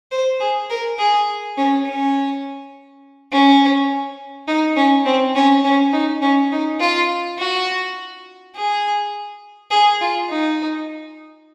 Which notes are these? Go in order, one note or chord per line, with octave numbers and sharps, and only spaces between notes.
C5
G#4
A#4
G#4
C#4
C#4
C#4
D#4
C#4
C4
C#4
C#4
D#4
C#4
D#4
F4
F#4
G#4
G#4
F4
D#4